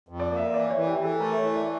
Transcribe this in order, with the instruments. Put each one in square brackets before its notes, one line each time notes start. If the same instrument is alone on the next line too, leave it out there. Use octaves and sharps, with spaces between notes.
[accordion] F2
[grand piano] D5
[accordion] A#3
[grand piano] E5
[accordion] E3 [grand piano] D5
[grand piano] C#5
[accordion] E3
[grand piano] G4
[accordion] E3
[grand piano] A4
[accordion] A3 [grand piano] A#4
[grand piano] C#5
[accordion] E3
[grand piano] D5